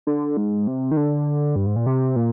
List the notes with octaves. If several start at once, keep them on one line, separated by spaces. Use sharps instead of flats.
D3
G#2
C3
D#3
D3
G2
G#2
A#2
C3
A#2